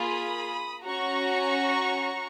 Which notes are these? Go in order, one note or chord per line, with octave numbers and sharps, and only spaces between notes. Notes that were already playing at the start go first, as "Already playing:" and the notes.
Already playing: A#3 F4 G#4 B5 D#6
C#4 F#4 A#5 C#6